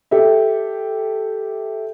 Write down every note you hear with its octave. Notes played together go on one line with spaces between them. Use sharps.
G4 A4 E5